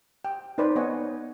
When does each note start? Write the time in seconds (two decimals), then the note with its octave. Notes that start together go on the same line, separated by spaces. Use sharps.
0.25 G5
0.58 D#4 A4 B4 C5 D5
0.76 B3 C#5 D#5 F#5 G#5